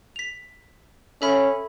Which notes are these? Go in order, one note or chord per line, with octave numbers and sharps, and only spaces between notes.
B6 F7
C#4 A4 E5 B5